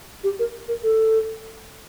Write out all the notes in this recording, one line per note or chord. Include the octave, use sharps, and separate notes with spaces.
G4
A#4
A#4
A4